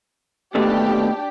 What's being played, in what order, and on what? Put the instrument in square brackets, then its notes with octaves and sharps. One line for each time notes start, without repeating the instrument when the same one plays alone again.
[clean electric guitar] D#2 B2 A3 [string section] D4 G4